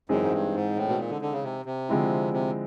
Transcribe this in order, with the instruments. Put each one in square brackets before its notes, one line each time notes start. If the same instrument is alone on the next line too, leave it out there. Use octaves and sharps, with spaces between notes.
[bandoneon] F#2 [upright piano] E3 G#3 C4 D#4 G#4
[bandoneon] G#2
G2
G#2
A2
B2
A#2
D3
D3
C#3
C3
C3
[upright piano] D3 F3 G#3 C4 E4
[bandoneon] C3